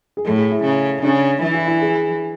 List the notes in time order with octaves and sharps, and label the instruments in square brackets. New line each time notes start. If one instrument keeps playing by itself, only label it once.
[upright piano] G#4
[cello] A2 [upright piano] A4
[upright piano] G#4
E4
[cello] C#3
[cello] C#3 [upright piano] D4
[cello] E3 [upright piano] E4
[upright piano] E4
E4
G#4